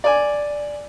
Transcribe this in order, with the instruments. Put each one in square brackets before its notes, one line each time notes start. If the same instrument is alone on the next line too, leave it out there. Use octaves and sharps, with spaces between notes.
[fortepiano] D5 G#5